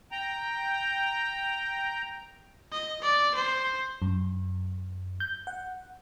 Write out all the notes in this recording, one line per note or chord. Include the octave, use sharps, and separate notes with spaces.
G5 A#5
D#5
D5
C5
F#2
G6
F#5